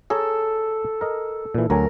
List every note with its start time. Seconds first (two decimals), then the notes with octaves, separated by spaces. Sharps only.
0.10 G#4 A4 C#5 A#5
1.01 A#4 D#5
1.55 A#2 E3
1.70 D2 F#3 A#4 G#5